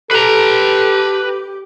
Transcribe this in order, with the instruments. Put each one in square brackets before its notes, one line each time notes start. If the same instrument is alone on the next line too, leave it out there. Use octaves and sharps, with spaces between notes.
[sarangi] G4 [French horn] A4 [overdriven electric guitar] B4 A#5